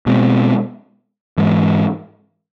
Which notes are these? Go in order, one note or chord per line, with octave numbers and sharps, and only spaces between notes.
B2 G#3 C4
G#2 E3 G#3